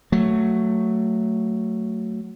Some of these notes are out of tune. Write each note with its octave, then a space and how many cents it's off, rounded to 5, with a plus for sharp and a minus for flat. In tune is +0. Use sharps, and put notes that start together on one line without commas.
F#3 +0 A3 +15